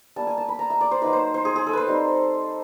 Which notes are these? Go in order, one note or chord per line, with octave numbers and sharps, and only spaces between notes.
G3 A#3 D4 A5
G#5
A5
B5
A#5
E5
D5
C5
F#3 A#3 D#4 B4
C5
C5
G#4
G#4
A4
B4 C5
G3 C4 D#4